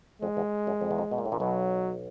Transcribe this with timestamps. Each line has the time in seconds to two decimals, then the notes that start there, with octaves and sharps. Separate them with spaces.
0.22 F2 G#3
0.37 E2
0.67 F#2
0.81 F2
0.91 E2
0.98 F2
1.11 B2
1.18 A#2
1.26 A2
1.32 A#1 A#2
1.40 B1 B2 F#3